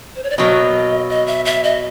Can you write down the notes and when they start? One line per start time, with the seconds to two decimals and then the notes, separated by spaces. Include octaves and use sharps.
0.16 C5
0.24 C#5
0.30 D5
0.38 B2 F#3 A#3 D#5
1.09 D#5
1.27 E5
1.45 E5
1.64 D#5